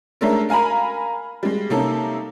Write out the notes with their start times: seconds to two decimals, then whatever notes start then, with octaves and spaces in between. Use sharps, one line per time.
0.21 G#3 A3 C#4 D4 A4 A#4
0.49 A#4 F5 G#5 A#5 B5
1.43 G3 G#3
1.70 C3 A#3 C#4 D#4 A4